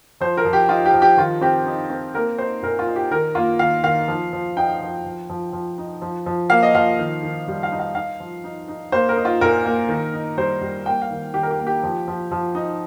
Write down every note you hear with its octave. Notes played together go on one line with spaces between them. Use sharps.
F3 C5
A#4
F3
G4
D#4 F4
G4
F3
G4
D#3 F4
C4 G4
D#4
C4
A#3 A#4
D#4 C5
A#2 A#4
F4
D#4
G4
D#3 A#4
A#3 F4
D#3 F5
D#3 F5
F3
F3
D#4 G5
F3
F3
F3
F3
D#4
F3
F3
A#3 F5
D#5
F3 F5
D#3
D#3
G3
F5
D#4
F5
D#4 F5
F3
D#4
D#4
A#3 C5
A#4
D#4
F4
A#2 A#4
A#3
D#3
D#4
G3 C5
G3
A#3 G5
F5
D#3
D#3 G4
A#4
G4
A#3
G4
F3
F3
F3
D#4